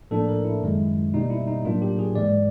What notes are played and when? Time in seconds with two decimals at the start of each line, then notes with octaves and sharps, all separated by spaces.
0.11 A2 F3 A#3 D4 A4
0.29 A#4
0.44 E4
0.62 F#2 D#3 G#3
1.13 B2 G3 A#3 D#4
1.30 E4
1.47 D#4
1.65 A2 F#3 A#3 D4 F4
1.82 G4
1.99 G#4
2.15 G#2 E3 G#3 D5